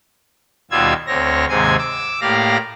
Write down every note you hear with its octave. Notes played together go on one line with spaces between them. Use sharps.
D#2 B2 G3 F4 E6 G#6
D2 C4 C#5 A#6
D#2 G#2 C3 C4 G#5 G#6
D6 E6
A2 A#3 G4 D5 F5 A#6